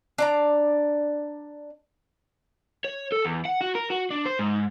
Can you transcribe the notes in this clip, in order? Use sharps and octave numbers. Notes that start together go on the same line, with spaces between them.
D4 D5 A#5
C#5
A4
E2
F#5
F#4
A#4
F#4
D4
C5
G#2